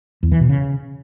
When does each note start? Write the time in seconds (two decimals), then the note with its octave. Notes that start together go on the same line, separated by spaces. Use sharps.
0.23 E2
0.32 E3
0.41 B2
0.49 C#3